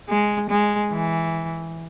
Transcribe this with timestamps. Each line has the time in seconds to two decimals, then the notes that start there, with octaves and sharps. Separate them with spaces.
0.09 G#3
0.49 G#3
0.91 E3